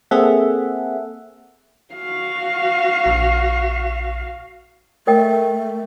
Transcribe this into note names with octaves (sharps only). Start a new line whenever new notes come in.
A#3 C4 G#4 A4 E5 F#5
F#4 F5
A#1
A3 A#4 D#5 G5